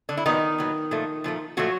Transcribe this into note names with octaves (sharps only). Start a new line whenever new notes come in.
D3 D4
E4
A#2 D#3 F#3 B3 D#4
A#2 F#3 B3
A#2 F3 A3
A#2 F3 A3
A#2 F3 F#3 A3 F#4